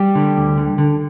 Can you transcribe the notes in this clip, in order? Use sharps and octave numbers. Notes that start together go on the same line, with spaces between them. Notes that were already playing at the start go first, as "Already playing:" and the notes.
Already playing: G3 G4
D3
D2
D3
D3